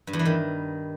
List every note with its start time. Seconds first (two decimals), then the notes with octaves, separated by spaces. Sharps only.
0.07 G2
0.13 E2
0.19 E3
0.25 D#3